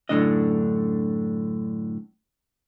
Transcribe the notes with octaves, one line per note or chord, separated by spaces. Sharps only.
F#2 A2 D3 E3 D4 D#5